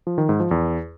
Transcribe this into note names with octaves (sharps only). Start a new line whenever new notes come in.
F3
D#3
G#2
F3
E2